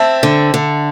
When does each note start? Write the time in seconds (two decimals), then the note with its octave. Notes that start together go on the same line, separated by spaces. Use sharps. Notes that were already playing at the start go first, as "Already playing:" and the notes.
Already playing: C4 E5 A5
0.23 D3
0.54 D3